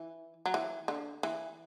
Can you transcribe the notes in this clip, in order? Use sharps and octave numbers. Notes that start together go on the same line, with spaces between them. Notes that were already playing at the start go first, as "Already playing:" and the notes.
Already playing: E3
F#3
E3
D3
E3